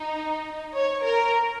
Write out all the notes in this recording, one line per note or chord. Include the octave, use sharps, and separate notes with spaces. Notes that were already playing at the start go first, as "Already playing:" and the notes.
Already playing: D#4
C#5
A#4